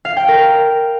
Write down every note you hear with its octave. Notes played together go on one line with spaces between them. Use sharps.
F5
G5
A#4